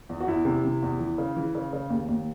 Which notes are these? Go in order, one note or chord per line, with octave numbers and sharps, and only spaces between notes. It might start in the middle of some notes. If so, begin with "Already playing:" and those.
E2
F#4
E2 E4
C3
C3
E2
E3
C#3
E3
C#3
C#3
D#2
D#2